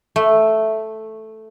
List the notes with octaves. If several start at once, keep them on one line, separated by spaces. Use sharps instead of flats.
A3